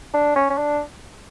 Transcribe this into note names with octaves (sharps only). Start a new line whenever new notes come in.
D4
C#4
C#4
D4